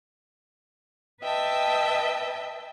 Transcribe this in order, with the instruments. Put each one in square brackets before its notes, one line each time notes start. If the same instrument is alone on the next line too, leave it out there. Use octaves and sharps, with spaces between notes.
[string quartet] B4 D#5 E5 G5 A5